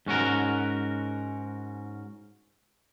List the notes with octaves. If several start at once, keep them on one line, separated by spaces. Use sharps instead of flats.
G#2 C#4 F#4 A#4